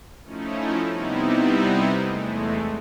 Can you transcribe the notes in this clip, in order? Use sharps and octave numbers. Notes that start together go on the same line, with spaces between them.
F3 A3 C#4 D#4 E4
C3 G3 B3 C4 D#4 E4
E2 G#3 A3